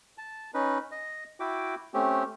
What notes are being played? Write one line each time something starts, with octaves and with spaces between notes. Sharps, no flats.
A5
C#4 D#4 B4
D#5
E4 F#4 E5 G5 D6
A3 C4 C#4 G4